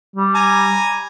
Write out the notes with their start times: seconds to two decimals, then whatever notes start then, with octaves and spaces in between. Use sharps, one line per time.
0.16 G3
0.35 G#5 A#5